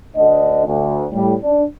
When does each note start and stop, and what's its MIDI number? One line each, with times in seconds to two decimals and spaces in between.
0.16 0.64 38
0.16 0.64 50
0.16 0.64 75
0.67 1.05 38
1.13 1.34 45
1.13 1.34 55
1.43 1.64 62